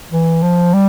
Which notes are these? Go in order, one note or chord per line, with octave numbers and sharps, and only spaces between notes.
E3
F3
G3